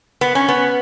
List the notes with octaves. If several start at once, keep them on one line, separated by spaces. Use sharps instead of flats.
B3
C#4
B3